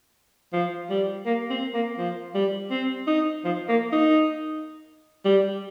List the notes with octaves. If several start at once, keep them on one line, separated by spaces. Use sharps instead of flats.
F3
G3
A#3
C4
A#3
F3
G3
C4
D#4
F3
A#3
D#4
G3